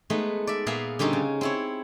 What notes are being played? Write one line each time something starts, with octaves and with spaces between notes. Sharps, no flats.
G#3 A3 B3 D#4
D5 E5
A#2 B3 G#4 E5 F5 A#5
D3 G3 C4 C#4 D#4
C#3
C4 E4 C#5